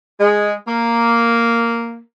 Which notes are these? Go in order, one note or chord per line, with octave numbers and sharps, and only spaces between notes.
G#3
A#3